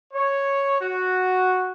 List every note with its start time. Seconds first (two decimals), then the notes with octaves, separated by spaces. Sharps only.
0.13 C#5
0.79 F#4